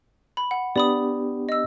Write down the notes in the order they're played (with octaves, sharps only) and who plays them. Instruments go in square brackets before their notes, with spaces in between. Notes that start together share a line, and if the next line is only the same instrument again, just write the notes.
[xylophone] B5
F#5
[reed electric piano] B3 D4 G4 [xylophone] D5 B5 D#6
[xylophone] D#5 E6